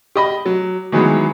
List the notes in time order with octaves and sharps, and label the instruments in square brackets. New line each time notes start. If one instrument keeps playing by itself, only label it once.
[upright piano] G4 D#5 B5
F#3
D#3 E3 F#3 G#3 B3